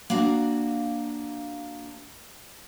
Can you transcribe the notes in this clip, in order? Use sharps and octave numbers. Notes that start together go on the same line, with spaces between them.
A#3 D4 F#4 F5